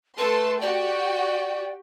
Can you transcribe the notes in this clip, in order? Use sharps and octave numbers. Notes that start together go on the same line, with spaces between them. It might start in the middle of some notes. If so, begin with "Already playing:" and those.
A3 A4 B4 C6
F#4 G4 D5 G5